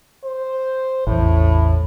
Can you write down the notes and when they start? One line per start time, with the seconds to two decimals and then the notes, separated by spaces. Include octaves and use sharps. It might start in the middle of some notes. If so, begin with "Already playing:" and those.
0.24 C5
1.07 A1 E2 A2